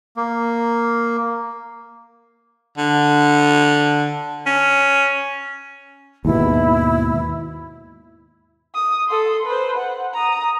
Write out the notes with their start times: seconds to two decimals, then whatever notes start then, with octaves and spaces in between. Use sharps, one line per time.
0.17 A#3
2.78 D3
4.46 C#4
6.25 D#2 G#2 B2 E4
8.75 D#6
9.08 A4 C6
9.46 B4 C5
9.78 F#5
10.14 A#5 D#6